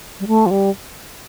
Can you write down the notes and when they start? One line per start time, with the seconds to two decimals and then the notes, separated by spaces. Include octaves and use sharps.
0.20 G3
0.27 A3
0.46 F3
0.51 G3